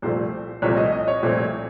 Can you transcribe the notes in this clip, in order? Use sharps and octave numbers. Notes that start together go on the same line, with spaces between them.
C2 A#2 F3 A3 C4 C5
C2 A#2 F3 A3 C4 C#5
D#5
D#5
C#5
C2 A#2 F3 A3 C4